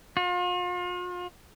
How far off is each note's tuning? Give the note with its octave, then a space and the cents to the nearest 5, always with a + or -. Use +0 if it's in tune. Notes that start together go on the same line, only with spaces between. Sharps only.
F4 +40